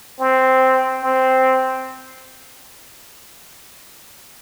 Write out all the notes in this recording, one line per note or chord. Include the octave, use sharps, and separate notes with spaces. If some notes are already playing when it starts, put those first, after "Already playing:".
C4
C4